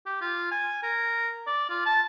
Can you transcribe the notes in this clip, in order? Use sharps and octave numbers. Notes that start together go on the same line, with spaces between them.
G4
F4
G#5
A#4
D5
F4
A5